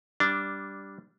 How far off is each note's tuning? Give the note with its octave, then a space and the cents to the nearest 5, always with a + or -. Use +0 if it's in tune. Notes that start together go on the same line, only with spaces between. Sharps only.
G3 +0 D4 -10